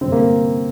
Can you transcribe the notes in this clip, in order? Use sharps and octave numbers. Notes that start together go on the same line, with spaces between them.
G2 D3 C4
A#3